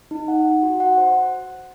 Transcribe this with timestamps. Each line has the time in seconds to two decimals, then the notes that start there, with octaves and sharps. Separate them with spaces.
0.11 D#4
0.28 F#5
0.46 F#5
0.63 F#4
0.80 F#5
0.98 C5